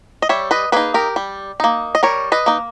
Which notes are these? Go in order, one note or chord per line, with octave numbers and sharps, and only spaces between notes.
D#5
G3 C#5 E5
B4 D#5
A#3 D#4 G#4 B4
G4 A#4
G3
A#3 D#4
D#5
G3 A#4 C#5
B4 D#5
A#3 D#4